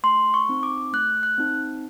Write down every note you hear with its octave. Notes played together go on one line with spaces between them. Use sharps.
A3 C6
C#6
C4 D#4
D6
A3 F#6
F#6
C4 D#4